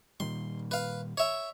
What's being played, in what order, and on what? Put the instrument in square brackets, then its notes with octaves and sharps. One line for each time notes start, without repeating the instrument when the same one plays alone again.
[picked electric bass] A#2 D#3 G3 [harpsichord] C6
[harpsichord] B4 F5
C#5 E5